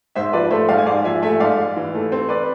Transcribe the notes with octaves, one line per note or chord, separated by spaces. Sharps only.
G#2 C5 E5
F3 B4 D5
A3 C5 E5
G#2 D5 F5
G#5
G#2 D5 F5
F3 E5 G#5
A3 E5 G#5
G#2 D5 F5
G#2
E3
A3
C4
B4 D5